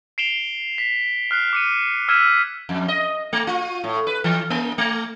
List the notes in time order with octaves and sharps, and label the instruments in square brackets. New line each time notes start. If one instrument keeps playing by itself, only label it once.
[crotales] C7 D7 E7 F7 G7
B6
F6 F#6 C7
D6 C#7 D#7
E6 F6 G#6 B6 D#7 E7
[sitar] F2
D#5
A3
F4
A2
B4
E3
A#3
A3